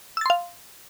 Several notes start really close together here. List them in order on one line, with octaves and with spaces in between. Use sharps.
E6 A6 C6 F5